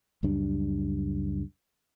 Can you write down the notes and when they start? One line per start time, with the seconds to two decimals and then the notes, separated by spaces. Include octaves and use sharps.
0.23 C#2 F#2 G3 D4